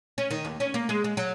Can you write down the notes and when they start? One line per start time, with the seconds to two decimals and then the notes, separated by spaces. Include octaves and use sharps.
0.18 C#4
0.31 D#3
0.45 D#2
0.60 C#4
0.74 A#3
0.89 G#3
1.04 G#3
1.17 F#3